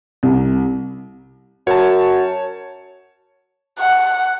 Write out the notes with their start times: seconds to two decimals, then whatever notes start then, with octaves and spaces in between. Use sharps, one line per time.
0.23 C2
1.67 F#2 F#4 C#5 A5
3.80 F#5